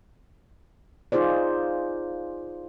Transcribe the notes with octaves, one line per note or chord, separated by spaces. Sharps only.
D#4 F4 G#4 C5 D5